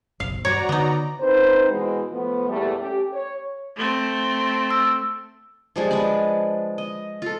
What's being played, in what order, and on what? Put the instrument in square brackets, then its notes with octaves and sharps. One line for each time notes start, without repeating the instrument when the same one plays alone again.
[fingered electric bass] F#1 B1 B2 [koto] F5
[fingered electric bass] G2 [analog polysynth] F#4 D5 A#5 [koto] C#5
[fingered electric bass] D3 [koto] B3 D#4
[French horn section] C4 D#4 B4 C5
B2 E3 G#3
F3 A3 B3
E2 A#2 G3 A3
A3 C#4 G4
C#5
[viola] A3 C4
[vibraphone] E6
[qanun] F3 G3 G#3 D4
G#3 D4 B4 D5
D#5
F4 A4